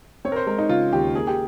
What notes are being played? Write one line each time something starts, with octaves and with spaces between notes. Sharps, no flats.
C4 C#5
A#4
C5
G#3 A#4
D#4
C#3 F4
D#2 G4
A#3 G#4
G4